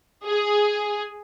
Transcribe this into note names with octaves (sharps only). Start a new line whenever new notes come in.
G#4